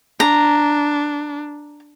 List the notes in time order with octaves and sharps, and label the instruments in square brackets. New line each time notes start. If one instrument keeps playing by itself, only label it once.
[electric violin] D4 [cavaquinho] A#5